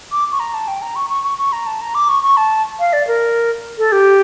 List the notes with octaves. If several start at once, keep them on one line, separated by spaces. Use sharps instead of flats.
D6
C#6
A#5
A5
G5
A#5
C#6
C#6
C#6
C#6
A#5
A5
A#5
D6
C#6
C#6
A5
F5
D5
A#4
A4
G4